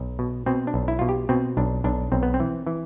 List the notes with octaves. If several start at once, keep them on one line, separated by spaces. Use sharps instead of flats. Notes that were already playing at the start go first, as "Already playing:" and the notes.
Already playing: B1
B2
B2 C4
D4
B1
E4
B2 F4
G4
B2 C4
B1 D4
B1 D4
B1 C4
B3
C4
E3
E3